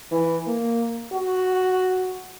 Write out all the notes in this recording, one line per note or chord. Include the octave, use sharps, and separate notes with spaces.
E3
A#3
F#4